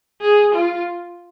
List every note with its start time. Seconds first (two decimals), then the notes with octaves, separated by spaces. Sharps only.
0.21 G#4
0.54 F4